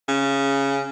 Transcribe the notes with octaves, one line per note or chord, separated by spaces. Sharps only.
C#3